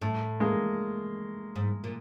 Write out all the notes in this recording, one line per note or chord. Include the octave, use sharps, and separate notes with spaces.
A2 A3
G#3 A#3
G#2
A#2